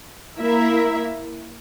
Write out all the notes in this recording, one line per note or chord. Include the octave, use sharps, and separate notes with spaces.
A#3 E4 A#4 E5